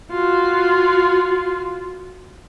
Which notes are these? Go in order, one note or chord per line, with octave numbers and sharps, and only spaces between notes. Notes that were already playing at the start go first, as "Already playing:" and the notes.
F4 F#4